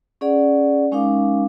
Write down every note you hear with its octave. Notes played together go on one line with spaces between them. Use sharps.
C#4 G#4 D5 F#5
G#3 C#4 D#4 A#4 F5 D6